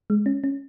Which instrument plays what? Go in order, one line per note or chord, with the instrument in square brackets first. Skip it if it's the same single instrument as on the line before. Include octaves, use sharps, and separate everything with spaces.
[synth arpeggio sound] G#3
C#4
C#4